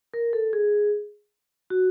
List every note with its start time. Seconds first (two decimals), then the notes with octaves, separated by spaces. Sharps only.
0.14 A#4
0.33 A4
0.53 G#4
1.70 F#4